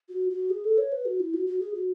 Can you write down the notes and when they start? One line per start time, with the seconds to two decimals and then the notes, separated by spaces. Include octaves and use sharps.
0.09 F#4
0.30 F#4
0.50 G#4
0.64 A4
0.78 C#5
0.92 B4
1.06 F#4
1.20 E4
1.34 F#4
1.46 F#4
1.60 G#4
1.74 F#4